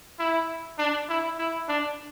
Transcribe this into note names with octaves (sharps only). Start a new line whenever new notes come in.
E4
D4
E4
E4
D4